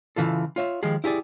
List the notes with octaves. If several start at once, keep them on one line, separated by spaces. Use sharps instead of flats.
C#3 E3 F4 A4
F4 C#5 E5
D#3 F3 G#3 G4 G#4
E4 G4 G#4 D5